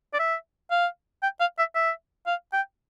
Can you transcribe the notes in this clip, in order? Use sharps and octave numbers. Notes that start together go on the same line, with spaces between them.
D5
E5
F5
G5
F5
E5
E5
F5
G5